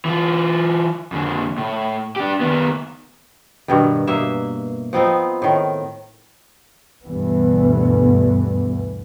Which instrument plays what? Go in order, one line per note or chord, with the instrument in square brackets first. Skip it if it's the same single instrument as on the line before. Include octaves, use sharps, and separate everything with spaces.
[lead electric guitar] E3 F4
F2 D3
A2
D4 G4
D#3 B3
[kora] G2 B2 D#3
B2 A#3 E5
F3 B3 C4 D#4
A2 D#3
[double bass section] D2 G2 B2 E3 B3